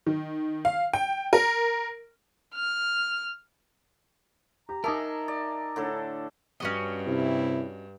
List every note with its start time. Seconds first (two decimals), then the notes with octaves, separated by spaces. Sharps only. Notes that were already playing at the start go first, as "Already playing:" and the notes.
0.06 D#3
0.65 F5
0.93 G5
1.33 A#4
2.55 F6
4.69 G4 A#5
4.84 D#4 G#4 A#4 E5 A5 D6 D#6
5.28 D5
5.76 A2 D3 A4
6.60 G2 C#4 F#4 D#5
7.07 C3 E4